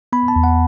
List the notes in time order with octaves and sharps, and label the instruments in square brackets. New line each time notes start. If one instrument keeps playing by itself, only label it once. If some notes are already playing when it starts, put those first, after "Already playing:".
[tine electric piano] B3 B5
A5
E2
F#5